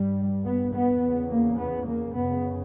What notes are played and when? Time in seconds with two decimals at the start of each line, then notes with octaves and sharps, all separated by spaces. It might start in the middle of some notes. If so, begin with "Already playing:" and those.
Already playing: G2 G3
0.45 B3
0.73 B3
1.01 E2 C#3
1.31 A#3
1.59 B3
1.87 A#3
2.16 F#2 C#3 B3